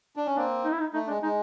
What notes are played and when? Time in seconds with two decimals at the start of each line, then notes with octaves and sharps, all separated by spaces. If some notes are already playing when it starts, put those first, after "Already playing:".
0.16 D4
0.26 C#4
0.36 A#3 C4 D4
0.65 D#4
0.73 E4
0.80 D#4
0.93 A3 D#4
1.08 G#3 D4
1.22 G#3 D#4